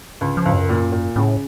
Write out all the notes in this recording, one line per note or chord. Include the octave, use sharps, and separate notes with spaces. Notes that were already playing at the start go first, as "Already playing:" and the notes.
C#2
F3
C#2
F#2
A#2
A#2
A2 C#3